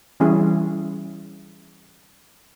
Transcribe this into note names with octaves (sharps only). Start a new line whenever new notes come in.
E3 G3 C#4 E4 G#4